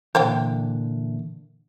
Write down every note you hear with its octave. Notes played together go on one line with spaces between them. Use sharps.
A#2 D3 E3 C5 F5 G5